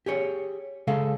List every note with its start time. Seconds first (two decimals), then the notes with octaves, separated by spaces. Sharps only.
0.06 G4 G#4 C#5
0.87 C#3 G#3 A4 F5